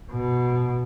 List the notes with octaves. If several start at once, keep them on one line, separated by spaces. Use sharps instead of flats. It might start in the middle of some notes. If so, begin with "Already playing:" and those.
B2